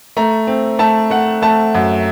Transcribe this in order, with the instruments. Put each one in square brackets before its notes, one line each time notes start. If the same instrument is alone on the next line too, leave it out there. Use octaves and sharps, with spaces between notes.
[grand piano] A3 A#5
C4
A3 A5
A3 F#5
A3 A5
F#2